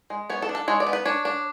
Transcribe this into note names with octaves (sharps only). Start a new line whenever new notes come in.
G#3
B3 C#5
A4
D4
A4
G#3 C#5
D5
B3
B4
D4 C#5
D4